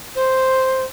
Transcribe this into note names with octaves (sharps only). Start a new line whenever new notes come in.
C5